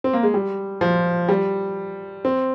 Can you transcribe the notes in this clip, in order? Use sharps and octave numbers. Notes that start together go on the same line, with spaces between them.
C4
A#3
G#3
G3
F3
G3
C4